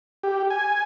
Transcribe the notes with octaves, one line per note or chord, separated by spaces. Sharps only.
G4
G#5